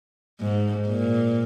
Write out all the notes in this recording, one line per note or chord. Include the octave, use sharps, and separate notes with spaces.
G#2
A#2